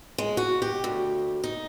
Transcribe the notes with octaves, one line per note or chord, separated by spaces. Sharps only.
G#3
F#4
G4
D2
D#4